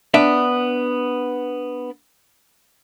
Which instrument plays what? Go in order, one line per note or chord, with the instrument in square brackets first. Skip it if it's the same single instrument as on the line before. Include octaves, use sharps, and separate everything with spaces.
[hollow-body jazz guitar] B3 D4 E5